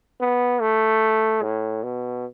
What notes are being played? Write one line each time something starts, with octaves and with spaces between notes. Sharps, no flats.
B3
A3
A2
B2